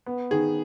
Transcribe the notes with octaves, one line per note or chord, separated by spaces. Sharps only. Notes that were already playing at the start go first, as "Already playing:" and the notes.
B3
D#3 G#4